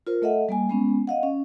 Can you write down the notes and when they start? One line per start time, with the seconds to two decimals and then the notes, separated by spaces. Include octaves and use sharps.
0.07 F4 A#4 C5
0.22 A3 A4 D#5 E5 F#5
0.49 G3 A#3 G#5
0.69 G#3 B3 C#4
1.07 D#5 F5 F#5
1.23 C#4